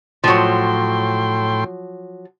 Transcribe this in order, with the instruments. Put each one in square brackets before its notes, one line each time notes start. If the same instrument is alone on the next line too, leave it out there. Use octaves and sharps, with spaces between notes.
[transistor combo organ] A2 G5 C6 [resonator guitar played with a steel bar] F3 F#3